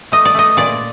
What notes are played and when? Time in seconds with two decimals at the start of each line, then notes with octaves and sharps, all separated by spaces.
0.12 A3 D#5
0.25 D5
0.35 A3 D#5
0.57 A#2 D5